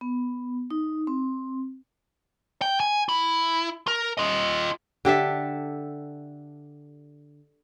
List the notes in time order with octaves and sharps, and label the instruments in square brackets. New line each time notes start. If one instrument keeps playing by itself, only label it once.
[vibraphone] B3
D#4
C4
[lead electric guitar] G5
G#5
E4
A#4
F4 D#5
[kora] D3 G4 A4 E5